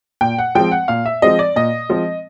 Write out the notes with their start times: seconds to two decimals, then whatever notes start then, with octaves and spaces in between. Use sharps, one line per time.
0.21 A#2 G5
0.38 F#5
0.55 F3 G#3 C4 G5
0.72 F#5
0.88 A#2 F5
1.06 E5
1.22 F3 G#3 C4 D#5
1.39 D5
1.56 A#2 D#5
1.89 F3 G#3 C4